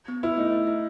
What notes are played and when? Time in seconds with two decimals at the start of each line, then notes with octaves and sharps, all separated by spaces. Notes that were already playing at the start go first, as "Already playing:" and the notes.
0.08 B3
0.23 E4 B4
0.37 A3 D#4
0.53 D#5
0.67 E4